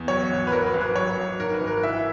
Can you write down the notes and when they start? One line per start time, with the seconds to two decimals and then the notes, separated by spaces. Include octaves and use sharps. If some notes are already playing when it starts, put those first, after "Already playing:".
Already playing: E2
0.08 F#3 C#5
0.30 G#1
0.47 B4
0.52 F#3 A#4
0.66 B4
0.74 G#1
0.81 B4
0.96 F#3 C#5
1.18 G#1
1.39 D#3 A#4
1.54 B4
1.62 G#1
1.67 A#4
1.83 E3 E5